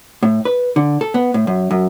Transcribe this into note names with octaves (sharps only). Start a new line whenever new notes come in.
A2
B4
D3
A4
B3
A2
F#2
F#2